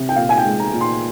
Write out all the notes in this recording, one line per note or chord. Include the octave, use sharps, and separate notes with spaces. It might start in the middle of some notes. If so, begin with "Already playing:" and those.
Already playing: C3
G5
A#2 F5
G#5
G5
G#3
A#5
A#2
C6